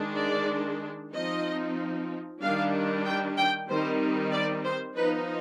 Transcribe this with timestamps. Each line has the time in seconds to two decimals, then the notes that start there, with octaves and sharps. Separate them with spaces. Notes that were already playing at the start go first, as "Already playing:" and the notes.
Already playing: D#3 G#3 D4
0.18 D5
1.13 F3 C4 D#4 D#5
2.41 D#3 G3 D4 F5
3.05 G5
3.37 G5
3.69 D#3 G3 C4 D#4 C5
4.32 D5
4.64 C5
4.96 F3 B3 D#4 B4